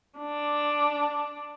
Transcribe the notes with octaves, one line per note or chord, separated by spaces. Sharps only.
D4